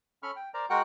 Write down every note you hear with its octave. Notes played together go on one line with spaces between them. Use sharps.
C#4 A4 B5 C#6 F6
G5
A#4 C5 D5 A#5
G#3 F#4 A#4 F#5 G5 F#6